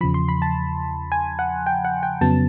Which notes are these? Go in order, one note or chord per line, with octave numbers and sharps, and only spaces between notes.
E2 C#3 F3 B5
C6
B5
A5
G#5
F#5
G5
F#5
G5
F2 C#3 F#3 B3 A5